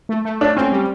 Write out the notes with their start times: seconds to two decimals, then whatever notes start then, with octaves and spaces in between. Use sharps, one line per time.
0.09 A3
0.25 A3
0.41 A3 D4
0.57 C4 C#4
0.72 G3